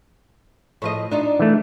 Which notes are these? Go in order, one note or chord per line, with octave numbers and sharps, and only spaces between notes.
A2 F3 D#5
D4 D#4 F4
E3 A3